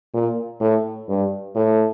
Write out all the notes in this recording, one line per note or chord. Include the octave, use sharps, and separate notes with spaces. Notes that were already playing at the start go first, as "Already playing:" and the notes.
A#2
A2
G2
A2